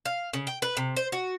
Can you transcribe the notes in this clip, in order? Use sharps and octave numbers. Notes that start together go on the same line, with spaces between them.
F5
C#3
G5
B4
C3
C5
F#4